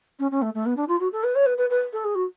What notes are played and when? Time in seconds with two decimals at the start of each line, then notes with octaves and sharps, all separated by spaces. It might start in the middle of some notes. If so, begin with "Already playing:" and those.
0.19 C#4
0.31 C#4
0.42 A3
0.54 A3
0.66 B3
0.76 D4
0.88 F4
1.00 F#4
1.12 A4
1.23 B4
1.35 C#5
1.46 B4
1.57 B4
1.70 B4
1.93 A4
2.04 G#4
2.15 F#4